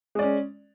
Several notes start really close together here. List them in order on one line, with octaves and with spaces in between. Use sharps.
G#3 D5 C#4